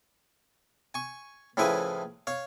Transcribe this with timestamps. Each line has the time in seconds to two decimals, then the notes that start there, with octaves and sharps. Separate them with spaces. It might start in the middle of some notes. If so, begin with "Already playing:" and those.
0.94 G#5 C#6
1.57 A2 C#3 F3 E4 B4 G#5
2.27 C#5 F5